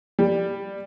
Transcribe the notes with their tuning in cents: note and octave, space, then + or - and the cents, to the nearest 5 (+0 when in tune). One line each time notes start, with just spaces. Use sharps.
G3 +10